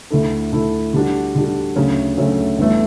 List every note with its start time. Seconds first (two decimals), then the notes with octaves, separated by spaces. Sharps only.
0.10 D2 D3 A3 E4 A4
0.52 D2 D3 A3 E4 A4
0.94 D3 G3 D4 F#4
1.35 D3 G3 D4 F#4
1.76 D2 C#3 F#3 A3 C#4
2.17 D2 C#3 F#3 A3 C#4
2.58 G1 G2 E3 A3